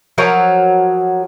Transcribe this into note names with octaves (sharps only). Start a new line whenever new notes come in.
F3 F#3 F#4 A#4